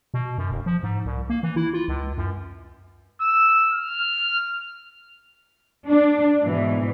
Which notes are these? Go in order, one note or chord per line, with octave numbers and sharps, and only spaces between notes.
B2
F#2
E1
F3
G#2
C2
A#3
E3
E4
F4
C#2
F#2
E6
F6
D4
G#2 B2 E3